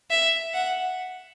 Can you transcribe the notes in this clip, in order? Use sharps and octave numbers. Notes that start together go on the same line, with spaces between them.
E5
F#5